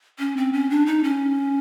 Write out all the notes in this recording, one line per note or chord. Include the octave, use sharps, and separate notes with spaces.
C#4
C4
C#4
D4
D#4
C#4